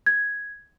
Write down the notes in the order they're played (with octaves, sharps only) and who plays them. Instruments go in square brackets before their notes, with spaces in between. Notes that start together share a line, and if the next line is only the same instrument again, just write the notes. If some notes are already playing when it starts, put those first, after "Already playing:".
[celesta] G#6